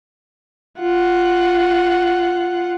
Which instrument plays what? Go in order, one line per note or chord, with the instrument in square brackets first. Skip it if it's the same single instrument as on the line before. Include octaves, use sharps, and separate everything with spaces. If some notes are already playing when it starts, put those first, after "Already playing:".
[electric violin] F4 F#5